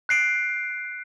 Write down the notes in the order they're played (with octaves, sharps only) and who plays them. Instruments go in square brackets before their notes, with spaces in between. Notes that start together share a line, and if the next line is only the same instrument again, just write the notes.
[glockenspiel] F#6 C7 D7